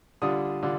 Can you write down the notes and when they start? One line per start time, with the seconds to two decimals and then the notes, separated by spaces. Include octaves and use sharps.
0.22 D3 G3 D4 F4 D#6
0.62 D3 G3 D4 F4